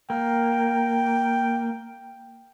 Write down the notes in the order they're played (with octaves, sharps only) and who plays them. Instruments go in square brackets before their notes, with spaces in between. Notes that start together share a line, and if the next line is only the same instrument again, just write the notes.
[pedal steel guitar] A#3 [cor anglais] G5